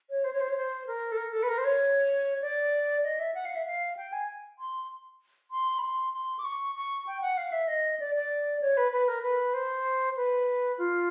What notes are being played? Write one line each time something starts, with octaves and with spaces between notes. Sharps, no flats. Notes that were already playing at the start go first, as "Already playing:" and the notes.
C#5
C5
C#5
C5
C#5
C5
A#4
A4
A#4
A4
B4
A#4
C5
C#5
D5
D#5
E5
F#5
F5
E5
F5
G5
G#5
C6
C6
B5
C6
C6
D6
C#6
C#6
G5
F#5
F5
E5
D#5
D5
D5
C#5
B4
B4
A#4
B4
C5
B4
F4